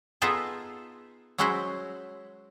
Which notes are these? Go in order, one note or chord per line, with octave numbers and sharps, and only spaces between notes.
B3 D#4 F4 G#4 A4 E5
F#3 G#3 C#4 E4 F#4 C5